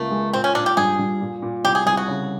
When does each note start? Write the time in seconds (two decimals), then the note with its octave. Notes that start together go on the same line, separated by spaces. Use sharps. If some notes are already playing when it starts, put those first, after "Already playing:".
Already playing: C#2 A3 A#3
0.11 G#3
0.33 A#2 C4
0.44 C#4
0.55 A#2 D4
0.66 G4
0.77 G2 G#4
0.99 G2
1.21 A#2
1.42 A#2
1.64 C2 G4
1.75 G#4
1.86 C2 G#4
1.97 F#4
2.08 C#3